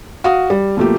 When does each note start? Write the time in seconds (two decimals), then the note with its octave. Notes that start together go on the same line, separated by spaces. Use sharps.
0.24 F#4 F5 D#6
0.50 G3
0.77 B2 F3 A3 A#3 G4